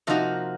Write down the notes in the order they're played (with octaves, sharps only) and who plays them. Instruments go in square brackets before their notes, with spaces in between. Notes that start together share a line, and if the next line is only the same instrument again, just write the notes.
[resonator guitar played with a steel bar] C3 F3 A#3 D#4 F#4